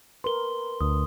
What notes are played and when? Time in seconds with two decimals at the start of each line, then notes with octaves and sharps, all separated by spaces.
0.24 A#4 B4 C6 G7
0.81 D2 D#6